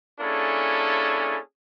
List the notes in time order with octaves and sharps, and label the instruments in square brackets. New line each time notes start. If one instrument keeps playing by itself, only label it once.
[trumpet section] A#3 C#4 D4 E4 G#4 A4